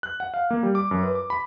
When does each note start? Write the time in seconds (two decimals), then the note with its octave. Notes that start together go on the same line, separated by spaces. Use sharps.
0.03 F#6
0.20 F#5
0.34 F5
0.51 A#3
0.63 G3
0.75 D6
0.91 F#2
1.03 B4
1.15 D6
1.30 B5